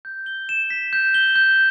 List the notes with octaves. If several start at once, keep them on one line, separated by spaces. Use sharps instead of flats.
G6
G7
E7
B6
G6
G7
G6